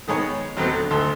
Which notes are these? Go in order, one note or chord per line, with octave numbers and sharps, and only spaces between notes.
D#3 G#3 B3 C#5
D#2 F#3 A3 B3 C4
D3
G#1 D2 A4 C6